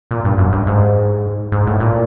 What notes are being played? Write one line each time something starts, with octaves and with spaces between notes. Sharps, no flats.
A#2
G2
F#2
G2
G#2
G#2
A2
A#2